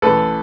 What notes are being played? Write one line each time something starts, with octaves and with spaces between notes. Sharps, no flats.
A1 A2 E3 A4 B4